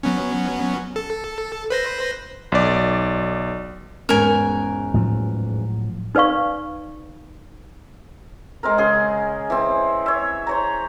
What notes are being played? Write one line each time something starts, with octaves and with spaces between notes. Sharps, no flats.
F#3 B3 C#4
A4
B4 C5 A#6
B1 D5
E2 G#2 C#4 A#4 G#5
A2 F3 F#3
D#4 B4 D5 F5 C#6
G#3 C4 A#4
C#3 G#4 C6
E3 C4
C#5 E5
C5 C#5 A#5